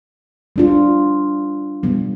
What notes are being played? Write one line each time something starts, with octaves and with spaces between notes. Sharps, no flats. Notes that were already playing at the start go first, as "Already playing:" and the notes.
G3 D4 F4
B2 G3 B3